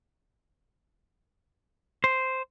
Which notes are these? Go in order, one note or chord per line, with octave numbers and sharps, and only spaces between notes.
C5